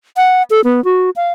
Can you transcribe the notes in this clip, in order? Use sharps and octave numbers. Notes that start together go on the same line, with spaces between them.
F#5
A4
B3
F#4
F5